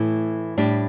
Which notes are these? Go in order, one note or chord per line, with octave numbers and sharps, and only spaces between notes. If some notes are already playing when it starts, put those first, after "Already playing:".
Already playing: A2 E3 A3 E4
A2 G3 D4 G4